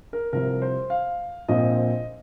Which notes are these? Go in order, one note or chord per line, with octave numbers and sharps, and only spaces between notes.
A#4
C2 C3 F3 A#4
C5
F5
A#1 A#2 F3 C4 D#5